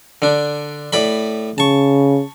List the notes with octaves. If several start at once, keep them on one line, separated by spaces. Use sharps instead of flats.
D3 D4
A2 D5 B5
C#3 A5 C#6